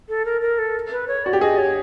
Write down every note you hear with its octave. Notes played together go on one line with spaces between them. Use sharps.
A4
A#4
A#4
A4
B4
C#5
F#4 D5
G4
G#4 D#5
C#5